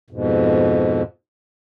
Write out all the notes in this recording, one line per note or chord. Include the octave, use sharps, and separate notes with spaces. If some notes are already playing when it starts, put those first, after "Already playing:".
F2 G#2 B2